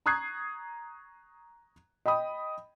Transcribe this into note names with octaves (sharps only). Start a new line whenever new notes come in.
A#5 C#6 D#6 F#6 G#6 C7
D#5 G5 B5 D#6